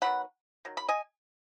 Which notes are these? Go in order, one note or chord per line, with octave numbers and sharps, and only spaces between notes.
D#3 F#3 B3 F#5 B5
D#3 F#3
B5
D#5 G#5